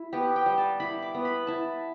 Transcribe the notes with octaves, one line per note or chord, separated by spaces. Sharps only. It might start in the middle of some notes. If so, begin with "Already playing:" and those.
Already playing: E4
B3 G4
G5
G3
A5
E4 B5
D6
B3
B5
E4 A5